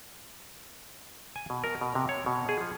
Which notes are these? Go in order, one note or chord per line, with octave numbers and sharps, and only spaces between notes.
G#5
B2
A#4
B2
C3
C#5
B2
G#4
F3